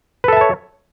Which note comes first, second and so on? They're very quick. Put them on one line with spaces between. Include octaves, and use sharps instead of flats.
B4 A4 E5 A5 C#5